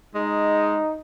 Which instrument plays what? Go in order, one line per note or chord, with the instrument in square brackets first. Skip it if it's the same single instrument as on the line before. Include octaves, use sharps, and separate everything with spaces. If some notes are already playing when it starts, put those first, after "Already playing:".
[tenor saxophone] G#3 [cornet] D#4